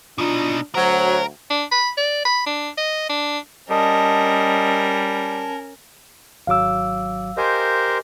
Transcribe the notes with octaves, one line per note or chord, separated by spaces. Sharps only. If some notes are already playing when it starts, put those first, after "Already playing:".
B2 D4 D#4 F4
D2 F#3 A#4 C5
D4
B5
D5
B5
D4
D#5
D4
G3 C#4 A#4 D#5 A5
G#1 F#3 F5 D6 E6
G4 A#4 C5 D#5 G#5 C6